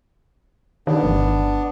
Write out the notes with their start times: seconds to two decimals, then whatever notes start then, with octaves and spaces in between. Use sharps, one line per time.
0.87 D#3 B3 D4
1.03 G1